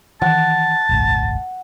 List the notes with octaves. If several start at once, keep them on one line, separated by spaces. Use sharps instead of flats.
D#3 E3 F#5 A5
D#1 G#1 C#2